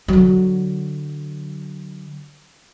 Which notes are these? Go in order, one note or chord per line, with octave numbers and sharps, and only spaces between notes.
D3 F#3